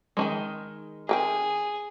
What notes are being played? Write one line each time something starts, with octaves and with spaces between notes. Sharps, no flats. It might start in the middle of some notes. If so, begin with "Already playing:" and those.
D#3 F3 G#3
C4 G#4 A#4 D#5